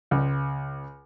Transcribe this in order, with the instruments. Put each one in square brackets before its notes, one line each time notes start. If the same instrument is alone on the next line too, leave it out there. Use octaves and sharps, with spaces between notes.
[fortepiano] C#2